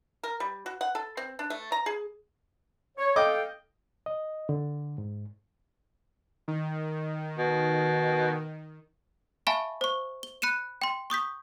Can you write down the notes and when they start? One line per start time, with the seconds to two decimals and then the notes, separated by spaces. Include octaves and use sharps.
0.23 A#4
0.40 G3
0.66 F#4
0.81 F#5
0.95 A4
1.17 C4
1.39 D4
1.50 A3
1.72 A#5
1.86 G#4
2.98 C#5
3.16 A4 D#5 F5 G5 D6
4.06 D#5
4.49 D3
4.98 G#2
6.48 D#3
7.38 B2
9.47 E5 F5 G#5 A5 B5 C#6
9.81 C5 C#6
10.23 G7
10.42 B5 F#6 C#7 D#7 E7
10.82 G5 C6
11.10 C#6 D#6 G6 B6